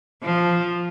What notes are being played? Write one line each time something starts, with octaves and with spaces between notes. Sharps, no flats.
F3